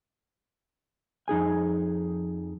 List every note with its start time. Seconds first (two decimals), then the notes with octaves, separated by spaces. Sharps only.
1.28 F2 D#4 G#4 G#5